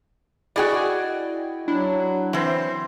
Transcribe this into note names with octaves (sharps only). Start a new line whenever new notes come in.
E4 F#4 G#4 D5 D#5 G5
F#3 D4 E4
E3 C4 C5